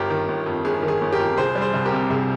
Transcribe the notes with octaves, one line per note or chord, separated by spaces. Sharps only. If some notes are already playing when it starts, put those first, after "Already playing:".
Already playing: G1 G4 A#4
D#3
G1
F2
G1 G#4
D#3
G#4
G1
G4 A#4
F2
C2 G#4 C5
G3
G#4 C5
C2
G4 A#4
C3
C2 G#4